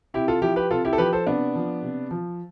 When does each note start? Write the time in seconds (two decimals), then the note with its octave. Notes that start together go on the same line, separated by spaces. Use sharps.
0.14 C3 E4 G4
0.28 F4 A4
0.42 F3 E4 G4
0.56 G4 B4
0.71 C3 F4 A4
0.85 E4 G4
0.93 A4
0.98 F3 G4 B4
1.13 A4 C5
1.27 C3 B3 D4
1.55 F3
1.83 C3
2.11 F3